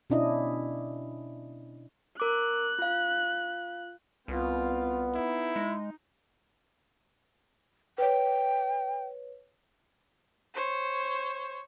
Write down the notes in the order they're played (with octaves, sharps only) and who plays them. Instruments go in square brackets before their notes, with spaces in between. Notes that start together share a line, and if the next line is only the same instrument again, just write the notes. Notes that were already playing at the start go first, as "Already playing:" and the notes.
[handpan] B2 C#4 D4 E4 D#5
[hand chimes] A#4 D6 [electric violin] F#6
[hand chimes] F4 F5
[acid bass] C2 [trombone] B3 [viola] C4 F4
[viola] D#4 [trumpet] E4
[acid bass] G#3
[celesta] B4 C#5 [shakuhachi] G5
[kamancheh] C5 C#5